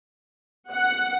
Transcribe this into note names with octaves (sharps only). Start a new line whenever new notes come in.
F#5